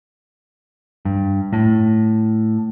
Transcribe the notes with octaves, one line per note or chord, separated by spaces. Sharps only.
G2
A2